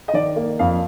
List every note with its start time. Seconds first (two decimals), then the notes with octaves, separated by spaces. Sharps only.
0.08 D#5
0.13 D#3 D5
0.36 A#3
0.59 F2 F5